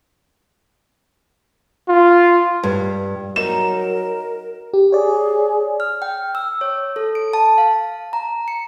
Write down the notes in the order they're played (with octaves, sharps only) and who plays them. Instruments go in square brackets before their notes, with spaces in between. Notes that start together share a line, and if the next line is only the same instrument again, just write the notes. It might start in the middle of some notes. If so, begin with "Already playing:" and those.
[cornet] F4
[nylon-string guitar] G2
[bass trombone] F#3 [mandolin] D#4 [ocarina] A#4 [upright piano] E7
[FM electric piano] G4
[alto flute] G#4 [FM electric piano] C#5 D5
[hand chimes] F6
G5
E6
C#5
A4
D7
A5
F5
A#5
C#7